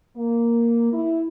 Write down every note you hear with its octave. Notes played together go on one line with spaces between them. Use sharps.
A#3
E4